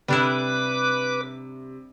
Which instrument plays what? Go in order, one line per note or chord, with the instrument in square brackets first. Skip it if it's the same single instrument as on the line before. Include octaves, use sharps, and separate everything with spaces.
[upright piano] C3 [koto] G3 D4 E4 [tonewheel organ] B4 D6